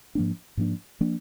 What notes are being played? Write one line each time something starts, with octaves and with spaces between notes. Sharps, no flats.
G#2 F3 A#3 D4
G#2 F3 A#3 D4
F3 A#3 D4